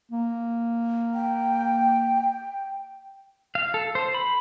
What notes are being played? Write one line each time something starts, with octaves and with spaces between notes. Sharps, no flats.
A#3
G5
F5
A4
C5
B5